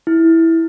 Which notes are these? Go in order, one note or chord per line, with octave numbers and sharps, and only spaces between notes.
E4